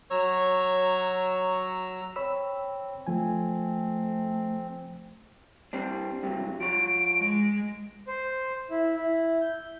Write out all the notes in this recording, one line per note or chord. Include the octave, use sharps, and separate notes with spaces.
F#3 C#5 A#5 E6
C4 C#5 B5 E6
F3 A3 C4 G#5
G3 C4 D4
G2 C3 F#3
F3 C#5 D7
G#3
C5
E4
E4
G6